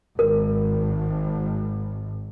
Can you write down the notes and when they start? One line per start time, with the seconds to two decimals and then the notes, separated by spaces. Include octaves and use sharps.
0.19 G#1 A#4